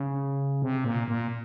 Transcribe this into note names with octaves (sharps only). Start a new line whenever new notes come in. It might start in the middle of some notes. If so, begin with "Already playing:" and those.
Already playing: C#3
C3
A#2
A#2